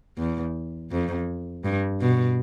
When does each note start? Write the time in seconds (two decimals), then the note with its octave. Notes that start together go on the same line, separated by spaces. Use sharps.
0.18 E2
0.91 F2
1.65 G2
2.01 B2